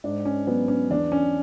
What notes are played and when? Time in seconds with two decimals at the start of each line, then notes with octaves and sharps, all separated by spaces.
0.04 G#2 D4
0.25 C#4
0.47 F#3 B3
0.68 C#4
0.90 E2 D4
1.12 C#4